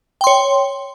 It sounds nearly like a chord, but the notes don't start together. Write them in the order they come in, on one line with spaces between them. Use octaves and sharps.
G5 C6 C#5